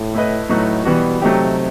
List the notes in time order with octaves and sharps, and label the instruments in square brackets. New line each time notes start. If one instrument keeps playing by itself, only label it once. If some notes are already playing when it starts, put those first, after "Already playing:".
Already playing: [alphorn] A2
[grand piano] A3 E4 B4 D#5
[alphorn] A2 [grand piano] F#3 A3 D#4 F#4 B4
[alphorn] B2 [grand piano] E3 G3 B3 F#4
[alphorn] C3 [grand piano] F#3 A3 D#4 G4